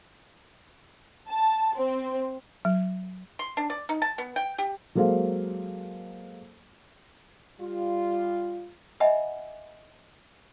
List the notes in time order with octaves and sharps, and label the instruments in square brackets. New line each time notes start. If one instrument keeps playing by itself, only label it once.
[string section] A5
C4
[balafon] F#3
[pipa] C6
D4
D5
D#4
A5
B3
G5
G4
[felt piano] F#3 G#3 A#3 A4 C5 F5
[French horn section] G3 F4
[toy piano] D#5 E5 F#5 G#5 B5